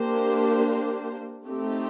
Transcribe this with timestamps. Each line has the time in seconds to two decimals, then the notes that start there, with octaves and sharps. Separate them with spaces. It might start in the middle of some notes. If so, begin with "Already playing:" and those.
Already playing: A#3 D4 G4 C5
1.45 A3 C4 D#4 G4